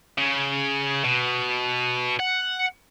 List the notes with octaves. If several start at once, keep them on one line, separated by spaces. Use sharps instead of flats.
C#3
B2
F#5